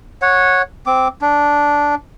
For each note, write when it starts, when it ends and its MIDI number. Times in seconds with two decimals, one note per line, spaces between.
0.22 0.62 73
0.22 0.62 78
0.86 1.08 60
0.86 1.08 86
1.21 1.95 62